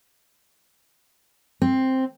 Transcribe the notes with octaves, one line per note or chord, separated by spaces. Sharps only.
C4